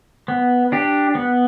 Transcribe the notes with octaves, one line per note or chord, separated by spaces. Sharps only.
B3
D4 G4
B3